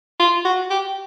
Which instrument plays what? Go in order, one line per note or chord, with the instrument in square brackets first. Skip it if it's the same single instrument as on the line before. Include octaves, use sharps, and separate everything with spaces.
[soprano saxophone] F4
F#4
G4